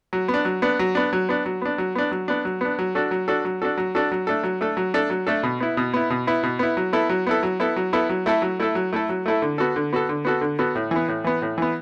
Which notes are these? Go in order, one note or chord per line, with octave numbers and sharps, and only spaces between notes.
F#3
B3
D4
F#3
B3 D4
F#3
B3 D4
F#3
B3 D4
F#3
B3 D4
F#3
B3 D4
F#3
B3 D4
F#3
B3 D4
F#3
D4 F#4 A4
F#3
D4 F#4 A4
F#3
D4 F#4 A4
F#3
D4 F#4 A4
F#3
A3 D4 A4
F#3
A3 D4 A4
F#3
A3 D4 A4
F#3
A3 D4 A4
B2
B3 E4
B2
B3 E4
B2
B3 E4
B2
B3 E4
F#3
B3 E4 A4
F#3
B3 E4 A4
F#3
B3 E4 A4
F#3
B3 E4 A4
F#3
A3 E4 A4
F#3
A3 E4 A4
F#3
A3 E4 A4
F#3
A3 E4 A4
D3
B3 F#4 A4
D3
B3 F#4 A4
D3
B3 F#4 A4
D3
B3 F#4 A4
A2
E3 B3
A2
E3 B3
A2
E3 B3